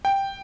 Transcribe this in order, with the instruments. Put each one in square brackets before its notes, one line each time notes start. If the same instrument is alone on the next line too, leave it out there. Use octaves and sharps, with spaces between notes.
[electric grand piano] G5